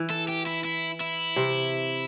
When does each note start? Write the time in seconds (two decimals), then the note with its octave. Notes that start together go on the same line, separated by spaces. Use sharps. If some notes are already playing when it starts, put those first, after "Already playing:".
Already playing: E3
0.10 A4
0.28 G4
0.47 E4
0.64 E4
1.00 E4
1.36 C3